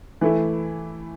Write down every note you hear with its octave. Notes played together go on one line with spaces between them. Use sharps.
E3 A3 E4